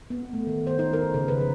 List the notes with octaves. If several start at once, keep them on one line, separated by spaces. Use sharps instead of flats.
B3
A3
D#3
C5
D#4
A#4
C#3
B4
F3